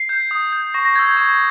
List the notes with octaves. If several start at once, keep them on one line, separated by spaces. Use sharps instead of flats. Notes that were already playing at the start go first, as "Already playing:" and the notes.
Already playing: C7
G6
D#6
G6
C#6 A#6
A#6
E6 G6 G#6
G6
C#6 G#6